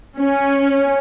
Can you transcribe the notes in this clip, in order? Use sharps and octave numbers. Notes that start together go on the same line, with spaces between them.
C#4